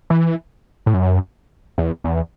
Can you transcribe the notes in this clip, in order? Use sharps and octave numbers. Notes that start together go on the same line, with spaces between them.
E3
A2
F#2
E2
E2